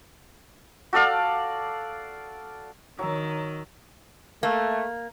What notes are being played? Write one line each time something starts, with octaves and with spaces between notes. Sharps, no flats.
F#4 A4 D5 F5
D#3 F#3 A#5 E6
A3 A#3